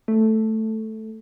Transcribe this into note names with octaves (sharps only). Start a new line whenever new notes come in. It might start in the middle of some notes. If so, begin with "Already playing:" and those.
A3